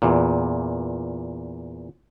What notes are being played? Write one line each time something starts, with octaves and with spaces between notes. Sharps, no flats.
E2 A#2